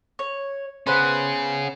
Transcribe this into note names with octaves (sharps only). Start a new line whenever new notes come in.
C#5
B3 C#4 G#4 B4 C5